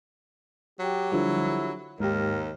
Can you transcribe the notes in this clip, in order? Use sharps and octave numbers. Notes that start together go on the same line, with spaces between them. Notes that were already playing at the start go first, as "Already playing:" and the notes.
F#3 G4
D3 F3 G3 E4
D#2 G#2 G4 A#4